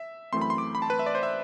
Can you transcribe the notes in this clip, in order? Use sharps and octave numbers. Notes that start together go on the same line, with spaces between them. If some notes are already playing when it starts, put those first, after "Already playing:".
Already playing: E5
F#2 E3 A3 C4 C6
B5
C6
D6
B5
A5
B4
E5
D5
C5
E5